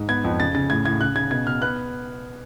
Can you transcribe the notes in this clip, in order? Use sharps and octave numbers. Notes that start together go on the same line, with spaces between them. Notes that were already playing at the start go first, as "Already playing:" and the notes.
Already playing: G#2
B3 G#6
F2
C#3 A6
C#3 A6
A2 G#6
A2 G#6
C#3 F#6
C#3 G#6
B2 G#6
B2 F6
B3 F#6